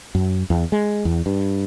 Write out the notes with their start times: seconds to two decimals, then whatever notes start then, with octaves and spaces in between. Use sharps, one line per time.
0.15 F#2
0.50 E2
0.72 G#3
1.05 E2
1.26 G2